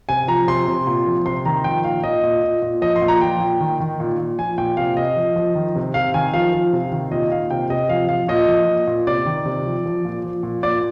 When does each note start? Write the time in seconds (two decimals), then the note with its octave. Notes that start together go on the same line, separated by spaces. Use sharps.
0.09 C3 G#5
0.28 F3 A#5
0.48 C3 C6
0.68 C3
0.87 A#2
1.07 F3
1.26 C3 C6
1.45 D#3 A#5
1.64 F3 G5
1.84 A#2 F5
2.03 A#2 D#5
2.23 A#2
2.44 A#2
2.62 A#2
2.82 F3 D#5
2.96 C6
3.02 A#2
3.08 A#5
3.21 F3 G5
3.41 A#2
3.61 D#3
3.80 D#3
4.00 A#2
4.19 A#2
4.38 F3 G#5
4.58 A#2 G5
4.77 C3 F5
4.97 C3 D#5
5.16 F3
5.36 F3
5.55 D#3
5.76 C3
5.94 C3 F5
6.14 D#3 G#5
6.33 F3 F5
6.53 F3
6.73 C3
6.92 D#3
7.12 A#2 D#5
7.31 A#2 F5
7.50 C3 G5
7.70 C3 D#5
7.89 F3 F5
8.09 F3 F5
8.28 A#2 D#5
8.48 F3
8.68 A#2
8.87 A#2
9.07 C3 D5
9.26 D#3
9.46 C3
9.66 F3
9.86 F3
10.05 A#2
10.24 F3
10.43 A#2
10.63 A#2 D5